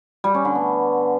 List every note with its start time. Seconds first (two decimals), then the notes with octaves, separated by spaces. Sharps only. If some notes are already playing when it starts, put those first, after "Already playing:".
0.24 G3
0.34 C#4
0.45 D3
0.55 B3